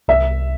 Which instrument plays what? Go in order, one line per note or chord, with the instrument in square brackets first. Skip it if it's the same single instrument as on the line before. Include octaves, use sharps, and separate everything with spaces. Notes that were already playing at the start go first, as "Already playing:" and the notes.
[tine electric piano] C2 [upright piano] E5